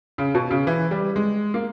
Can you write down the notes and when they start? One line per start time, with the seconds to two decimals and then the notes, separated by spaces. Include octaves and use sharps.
0.18 C#3
0.35 B2
0.50 C#3
0.67 E3
0.91 G3
1.16 G#3
1.54 A#3